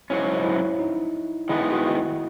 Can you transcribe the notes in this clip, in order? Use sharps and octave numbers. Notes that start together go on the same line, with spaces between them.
G#2 F#3 C#4 E4
E4
D#4
D#3 G#3 B3 E4
F#4